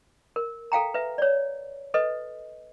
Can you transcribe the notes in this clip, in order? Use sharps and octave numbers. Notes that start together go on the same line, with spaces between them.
A#4
A4 F5 G5 A#5
B4 E5
C#5 D5
A4 B4 D#5